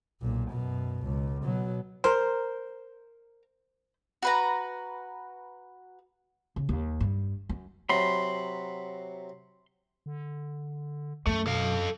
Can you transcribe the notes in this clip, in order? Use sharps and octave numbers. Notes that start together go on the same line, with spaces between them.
B1 A#2
F#2 B2
C#2
B2 F#3
A#4 C5 A#5
F#4 B4 A#5
C#3
D#2
G2
F#2
C3 F#3 B5 C6
D3
F#2 A3
B2 A4 F5